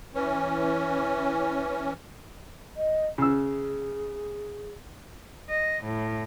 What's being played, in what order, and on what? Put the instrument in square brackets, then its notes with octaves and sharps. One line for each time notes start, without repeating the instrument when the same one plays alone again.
[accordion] E3 C#4
[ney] D#5
[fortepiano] C#3 E6 [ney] G#4
[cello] D#5
A2